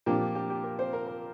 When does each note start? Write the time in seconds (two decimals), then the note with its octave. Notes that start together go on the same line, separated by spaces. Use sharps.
0.06 A#2 F3 A#3 D4 G4
0.35 G4
0.50 G4
0.64 A#4
0.79 C5
0.93 A#4
1.07 A#4